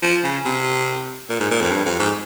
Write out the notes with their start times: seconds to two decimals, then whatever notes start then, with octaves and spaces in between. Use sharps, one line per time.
0.03 F3
0.24 C#3
0.45 C3
1.30 A#2
1.40 G#2
1.51 A#2
1.61 F2
1.71 G2
1.85 F2
1.99 G#2